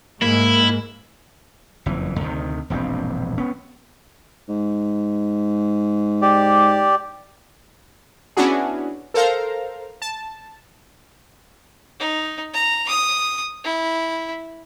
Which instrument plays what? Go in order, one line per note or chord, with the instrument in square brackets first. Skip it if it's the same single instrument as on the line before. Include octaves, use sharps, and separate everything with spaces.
[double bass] G#2 G#3 [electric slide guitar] A#3 [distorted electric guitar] E4
[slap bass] F#1 F2 E3
D2 C3 D#3
E1 A#1 G2 C4
B3 C#4
[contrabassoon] G#2
[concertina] G4 D5
[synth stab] B3 C#4 D4 E4 F#4 G#4
A4 A#4 C5 F5 A#5
A5
[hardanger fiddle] D#4
A#5
D#6
E4